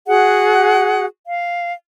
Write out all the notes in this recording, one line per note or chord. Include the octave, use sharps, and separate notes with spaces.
F#4 G#4 F#5
F5